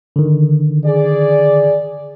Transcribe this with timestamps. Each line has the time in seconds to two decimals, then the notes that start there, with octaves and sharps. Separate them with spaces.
0.16 D3 D#3
0.85 G#4 D5